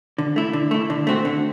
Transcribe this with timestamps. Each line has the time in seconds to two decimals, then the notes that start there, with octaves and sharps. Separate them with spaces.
0.18 D3
0.36 A3 E4
0.53 D3
0.71 A3 E4
0.90 D3
1.07 A3 C4 F#4
1.25 D3